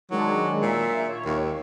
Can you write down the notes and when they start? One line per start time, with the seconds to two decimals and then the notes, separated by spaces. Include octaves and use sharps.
0.10 D#3 F#3 G#3 D4
0.62 A#2 E5
1.09 C#5
1.25 D#2